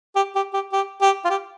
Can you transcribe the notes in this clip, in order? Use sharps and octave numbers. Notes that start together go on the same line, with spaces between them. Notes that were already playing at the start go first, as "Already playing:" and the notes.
G4
G4
G4
G4
G4
F4
G4